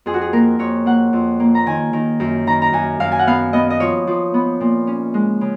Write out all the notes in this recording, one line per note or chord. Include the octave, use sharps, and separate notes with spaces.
F2 G#4
F#4
G#4
A#3 A#4
F2 C#5
A#3 F#5
F2
A#3
A#5
D#3 G#5
D#3
F#2
D#3 A#5
A#5
F#2 G#5
F#2 F5
G#5
F#5
B3 F5
B3 D#5
D#5
F3 C#5
F3
B3
A#2
C#4
G#3
C#3